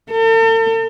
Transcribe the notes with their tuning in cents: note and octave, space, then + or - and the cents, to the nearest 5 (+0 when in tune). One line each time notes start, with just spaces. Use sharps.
A4 +45